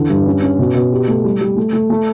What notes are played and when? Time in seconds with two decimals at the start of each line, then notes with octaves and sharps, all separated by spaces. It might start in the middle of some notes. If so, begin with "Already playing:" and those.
Already playing: E2 D3
0.10 G2
0.27 C#4
0.42 C#4
0.59 B2
0.75 B2
0.92 G4
1.08 A3
1.24 G3
1.41 G3
1.57 A3
1.73 A3
1.90 A3